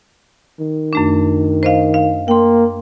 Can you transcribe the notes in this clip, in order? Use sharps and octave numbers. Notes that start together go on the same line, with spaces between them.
D#3
F#2 A3 D4
C5 D#5 F5
F5
A#3 G5 C6